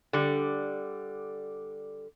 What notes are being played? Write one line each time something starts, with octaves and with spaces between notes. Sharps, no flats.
D3 G3